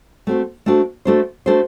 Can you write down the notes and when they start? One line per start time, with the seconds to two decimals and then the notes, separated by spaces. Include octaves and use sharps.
0.27 A3 C4 F#4 C5
0.66 A3 D4 F#4 A4 C5
1.05 A3 D4 F#4 A4 C5
1.46 A3 D4 F#4 A4 C5